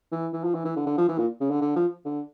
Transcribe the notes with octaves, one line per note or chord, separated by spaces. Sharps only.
E3
E3
F3
E3
E3
D3
D3
F3
E3
A#2
C#3
D3
D3
F3
D3